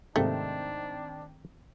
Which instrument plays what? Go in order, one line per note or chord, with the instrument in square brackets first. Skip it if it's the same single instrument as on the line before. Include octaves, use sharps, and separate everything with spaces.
[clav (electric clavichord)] G#2 C3 A#3 [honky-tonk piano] D#3 C4 [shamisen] A3 [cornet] D4